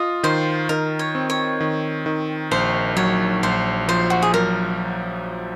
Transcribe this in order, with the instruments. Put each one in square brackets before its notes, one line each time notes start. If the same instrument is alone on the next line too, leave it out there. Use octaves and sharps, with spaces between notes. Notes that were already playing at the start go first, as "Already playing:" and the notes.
Already playing: [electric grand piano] F4 [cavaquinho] D#5
[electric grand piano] D#3 [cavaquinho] C5
[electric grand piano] D#3 [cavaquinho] A#4
[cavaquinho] C#5
[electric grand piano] C4
[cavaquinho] C#5
[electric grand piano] D#3
D#3
[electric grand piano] A#1 [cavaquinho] C5
[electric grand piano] F#3 [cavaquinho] C#5
[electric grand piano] A#1 [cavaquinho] C5
[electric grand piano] F3 [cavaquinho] C5
[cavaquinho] F#4
G#4
[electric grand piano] F#3 [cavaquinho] A#4